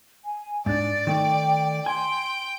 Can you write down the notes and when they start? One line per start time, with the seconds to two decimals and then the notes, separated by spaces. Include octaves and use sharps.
0.25 G#5
0.66 G#2 D4 D5 A6
1.07 D#3 A3 G5
1.86 G5 G#5 C6